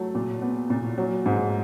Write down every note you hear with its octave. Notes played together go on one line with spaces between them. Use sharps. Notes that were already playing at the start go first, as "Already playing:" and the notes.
Already playing: F#3 A3
A#2
B3
A#2
F#3
G#2